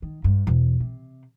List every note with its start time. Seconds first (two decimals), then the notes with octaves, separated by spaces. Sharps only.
0.02 D#3
0.24 G2
0.47 E1
0.80 C3